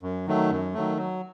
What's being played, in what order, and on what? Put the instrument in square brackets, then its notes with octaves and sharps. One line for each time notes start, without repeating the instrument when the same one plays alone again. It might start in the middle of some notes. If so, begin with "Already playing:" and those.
[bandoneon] F#2
D#3 F#3 A3
F#2
D#3 F#3 A3
F#3